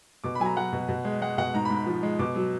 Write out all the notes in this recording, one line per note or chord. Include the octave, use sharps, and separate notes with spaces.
B2 D6
B5
F#3 G#5
A#5
F#3 F#5
B2
B2
G#3
G#3 F#5
B2 F#5
G#2 A#5
B5
G#2
B5
F3
G#3
B2 D6
F#3